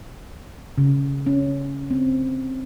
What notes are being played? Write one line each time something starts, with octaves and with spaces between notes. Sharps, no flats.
C#3
C#4
C4